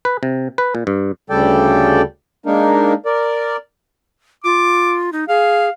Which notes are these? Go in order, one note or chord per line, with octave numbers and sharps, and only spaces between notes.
B4
C3
B4
A#2
G2
D2 C#3 G3 A4 D5 G5
G#3 A#3 D4 D#4 A#4
A#4 D5
F4 D6
D#4
G#4 F5